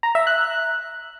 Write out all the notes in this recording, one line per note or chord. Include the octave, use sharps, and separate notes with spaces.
A#5
E5
F#6